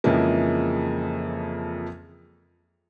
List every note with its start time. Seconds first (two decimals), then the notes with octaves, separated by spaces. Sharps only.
0.04 F2 C#3 E3 F3 G#3 A#3